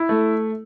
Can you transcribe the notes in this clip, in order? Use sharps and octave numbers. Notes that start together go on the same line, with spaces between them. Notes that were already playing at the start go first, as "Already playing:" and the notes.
Already playing: E4
A3